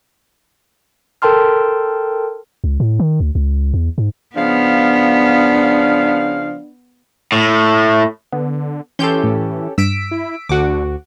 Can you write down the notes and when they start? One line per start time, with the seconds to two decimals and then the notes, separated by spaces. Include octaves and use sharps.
1.22 A4 A#4 G5 A5 C6 F6
2.64 C#2
2.80 A2
3.00 D#3
3.20 D2
3.35 C#2
3.74 E2
3.98 G#2
4.36 C#3 F3 B3 D4 F5
7.32 A2
8.32 D3 B3
8.99 E3 C#4 G4 A4 C6 G6
9.24 A2
9.78 G2 E6 B6 D7
10.11 E4
10.49 D2 D3 F#4 F#5 D6